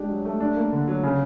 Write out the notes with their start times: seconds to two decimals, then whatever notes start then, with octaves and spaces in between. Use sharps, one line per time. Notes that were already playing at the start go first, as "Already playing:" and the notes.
Already playing: G#3 D4 G4
0.09 F#3
0.25 A3
0.40 D4
0.57 A#3
0.73 D3
0.87 F#3
1.03 C#3